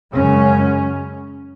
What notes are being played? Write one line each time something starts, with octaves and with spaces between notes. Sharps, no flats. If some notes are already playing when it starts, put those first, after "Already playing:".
F#2 C#3 G#3 C#4